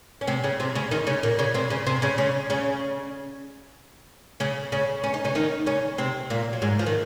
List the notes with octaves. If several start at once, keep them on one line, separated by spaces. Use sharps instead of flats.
C#4
C3 C4
C#3 C#4
C3 C4
C#3 C#4
D#3 D#4
C#3 C#4
A#2 A#3
C#3 C#4
C3 C4
C#3 C#4
C3 C4
C#3 C#4
C#3 C#4
C#3 C#4
C#3 C#4
C#3 C#4
C#4
D#4
C#3 C#4
D#3 D#4
C#3 C#4
C3 C4
A#2 A#3
F#3
G#2 G#3
F3
D#3